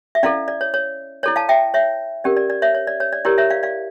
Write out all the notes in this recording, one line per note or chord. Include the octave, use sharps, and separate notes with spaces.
E5
C#4 E4 A4 D5 F5
D5
C#5
C#5
E4 A4 C#5 D5
F5 A5
E5 G5
C#5 E5
C#4 G4 A#4 D5
D5
D5
C#5 E5
C#5
D5
C#5
D5
E4 G4 A#4 C#5 D5
C#5 E5
D5 F5
D5 F5